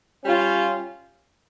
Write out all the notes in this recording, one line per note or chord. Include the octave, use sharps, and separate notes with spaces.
G3 C#4 F4